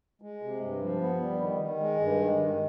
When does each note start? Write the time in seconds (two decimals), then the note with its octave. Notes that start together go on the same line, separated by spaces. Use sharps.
0.22 G#3
0.42 C3
0.62 G2
0.81 F3
1.01 B3
1.21 G3
1.40 D#3
1.60 D#3
1.80 G#3
2.00 G2
2.19 D#3
2.38 D#3